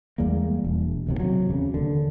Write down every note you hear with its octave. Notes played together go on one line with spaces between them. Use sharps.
E2 G3 G#3 A#3
E1
F1 D#2 C3
C3 F#3
E2 C#3
D#2 D3